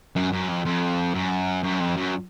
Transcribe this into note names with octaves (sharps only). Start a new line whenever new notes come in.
F#2
F#2
F2
F2
F#2
F#2
F2
F#2